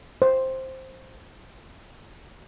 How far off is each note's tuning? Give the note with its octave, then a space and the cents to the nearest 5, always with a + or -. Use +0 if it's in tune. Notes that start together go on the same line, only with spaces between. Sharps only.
C5 +5